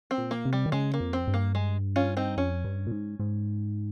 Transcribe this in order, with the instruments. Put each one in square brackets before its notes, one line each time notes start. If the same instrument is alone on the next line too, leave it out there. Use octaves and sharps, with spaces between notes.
[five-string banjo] C4
[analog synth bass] A#2
[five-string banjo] A#3
[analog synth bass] C3
[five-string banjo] G3
[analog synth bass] D#3
[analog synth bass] C#3 [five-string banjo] G#3
[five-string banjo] A#3
[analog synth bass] F2
[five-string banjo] C4
[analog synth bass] G2
[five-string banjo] A#3
G#3
C#4 F4
C4 D#4
[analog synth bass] F2 [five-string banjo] C#4
[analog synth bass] G2
A#2
G#2
G#2